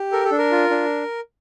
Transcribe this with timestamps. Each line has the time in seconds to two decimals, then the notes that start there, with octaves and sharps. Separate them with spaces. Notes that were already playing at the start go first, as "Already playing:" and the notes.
Already playing: G4
0.12 A4 A#4
0.25 A4
0.31 D4
0.38 A#4
0.52 F4
0.70 D4